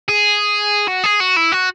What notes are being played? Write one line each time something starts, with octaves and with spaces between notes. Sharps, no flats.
G#4
F#4
G#4
F#4
E4
F#4